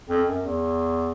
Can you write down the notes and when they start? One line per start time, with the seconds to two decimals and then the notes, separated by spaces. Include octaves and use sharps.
0.10 F2
0.28 F#2
0.45 E2